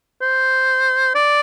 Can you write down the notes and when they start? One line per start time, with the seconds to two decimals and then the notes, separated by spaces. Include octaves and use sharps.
0.22 C5
1.15 D5